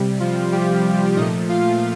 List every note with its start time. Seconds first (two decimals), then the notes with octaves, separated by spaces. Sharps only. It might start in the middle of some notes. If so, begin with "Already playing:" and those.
Already playing: C3 G3
0.20 F3 F4
0.52 G3 G4
1.16 A#2 F3 A3 D#4 D#5
1.49 F4 F5